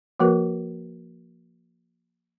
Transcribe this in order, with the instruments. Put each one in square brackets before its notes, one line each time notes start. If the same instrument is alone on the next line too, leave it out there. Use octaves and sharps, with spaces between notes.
[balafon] F3 A#3 F#4 A#4 B4